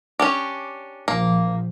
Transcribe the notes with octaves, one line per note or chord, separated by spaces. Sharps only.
C#4 D4 G4
A#1 F3 A#3